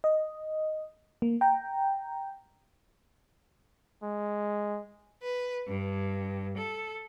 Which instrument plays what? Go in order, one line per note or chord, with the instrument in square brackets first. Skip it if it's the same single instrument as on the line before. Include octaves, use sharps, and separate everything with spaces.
[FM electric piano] D#5
A#3
G5 A#5
[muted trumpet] G#3
[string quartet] B4
G2
A4